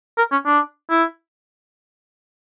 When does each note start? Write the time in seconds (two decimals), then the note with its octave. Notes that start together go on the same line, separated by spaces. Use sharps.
0.18 A#4
0.32 C#4
0.46 D4
0.90 E4